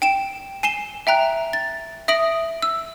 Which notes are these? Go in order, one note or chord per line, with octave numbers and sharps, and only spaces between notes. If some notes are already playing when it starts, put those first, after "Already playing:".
G5 D7 E7
G#5 C7 E7 G7
E5 G5 A#5 F#6
A6
E5 D#6 A#6 D7 F#7
E6